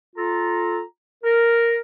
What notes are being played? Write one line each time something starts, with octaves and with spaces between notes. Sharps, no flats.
F4 A4 A#5
A#4